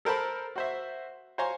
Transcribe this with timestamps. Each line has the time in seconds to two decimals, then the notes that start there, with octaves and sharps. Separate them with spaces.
0.05 A4 A#4 C5 A5 B5
0.56 F#4 C5 E5
1.38 C5 C#5 F5 G#5 A#5 C6